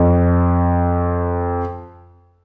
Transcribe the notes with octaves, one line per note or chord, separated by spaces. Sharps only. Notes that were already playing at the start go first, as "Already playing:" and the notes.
Already playing: F2